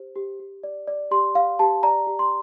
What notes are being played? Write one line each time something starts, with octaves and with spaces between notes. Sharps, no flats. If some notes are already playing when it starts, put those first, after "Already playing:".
Already playing: G4 C5
G4
G4
D5
D5
G4 C6
G4 F5
G4 A5
D5 A#5
G4
C6